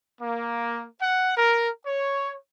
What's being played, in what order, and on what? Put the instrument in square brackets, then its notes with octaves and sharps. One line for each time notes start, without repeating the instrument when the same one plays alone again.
[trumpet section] A#3
F#5
A#4
C#5